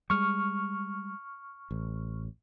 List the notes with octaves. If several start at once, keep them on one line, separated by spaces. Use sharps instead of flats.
G3 G#3 C#6 F6
A1